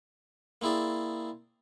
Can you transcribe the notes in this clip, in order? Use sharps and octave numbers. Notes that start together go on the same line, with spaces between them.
A#3 C4 E4 G#4 D5